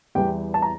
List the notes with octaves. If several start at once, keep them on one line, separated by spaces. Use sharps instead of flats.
E2 E3 G3 G4 G5
A5
A#5